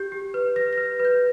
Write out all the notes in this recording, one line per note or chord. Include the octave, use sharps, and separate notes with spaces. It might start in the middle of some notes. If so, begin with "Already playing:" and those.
Already playing: G4 G6
G4
B4
B4 A#6
B4 A#6
B4
G6